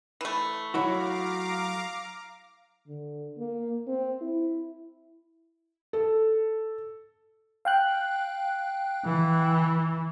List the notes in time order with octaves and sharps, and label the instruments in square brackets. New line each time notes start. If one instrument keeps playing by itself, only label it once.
[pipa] E3 A3
[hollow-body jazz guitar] F#3 E4 F#4 [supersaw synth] F5 A#5 D6
[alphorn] D3
A#3
C4
E4
[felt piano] A4
[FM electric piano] F5 G5 F#6
[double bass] E3